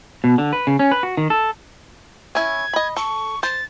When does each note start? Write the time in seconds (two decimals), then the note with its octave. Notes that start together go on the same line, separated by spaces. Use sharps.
0.24 B2
0.38 D3
0.53 B4
0.67 C#3
0.79 C#4
0.92 B4
1.03 F#4
1.17 D#3
1.30 A4
2.35 C#4 E4 G#6
2.73 D#5 B5
2.96 A4 C#6
3.43 C5 A6